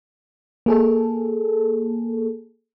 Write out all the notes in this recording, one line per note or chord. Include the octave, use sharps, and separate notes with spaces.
A#3 G#4 A4